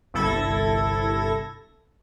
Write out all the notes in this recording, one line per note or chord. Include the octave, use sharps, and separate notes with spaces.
G1 C2 E4 A4 G#6 A#6